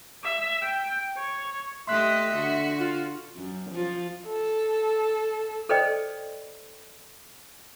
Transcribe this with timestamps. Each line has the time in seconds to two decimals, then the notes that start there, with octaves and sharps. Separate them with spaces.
0.23 E5
0.62 G5
1.17 C#5
1.87 A3 G4 D#5 E5 C6 F#6
2.34 D3 F#4
2.79 F4
3.36 F#2
3.70 F3 F4
4.27 A4
5.69 A4 B4 C5 D5 D#5 G5